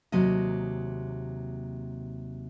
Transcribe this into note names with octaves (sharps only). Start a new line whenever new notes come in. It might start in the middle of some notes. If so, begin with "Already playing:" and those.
D#2 C3 F#3 A#3 D#5